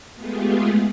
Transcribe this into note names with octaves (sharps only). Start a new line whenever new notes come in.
G#3 A3 B3 F4 G4 G#4